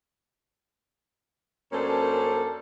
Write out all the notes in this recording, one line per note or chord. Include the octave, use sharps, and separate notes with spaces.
F#2 A#3 C#4 D4 A4 C5